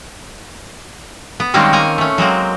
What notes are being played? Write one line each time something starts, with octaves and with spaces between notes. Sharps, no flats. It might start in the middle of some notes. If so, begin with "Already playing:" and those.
B3
D#3 G3 G#3 A#3 C4 C#4
A#3 G#5 A#5
A3 C#4
F#3 G#3 A#3 C4